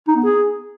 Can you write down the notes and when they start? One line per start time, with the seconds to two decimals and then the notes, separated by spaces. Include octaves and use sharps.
0.08 D#4
0.16 B3
0.24 G#4